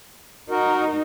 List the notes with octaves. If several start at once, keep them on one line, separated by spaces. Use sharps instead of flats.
D#4 F#4 A#4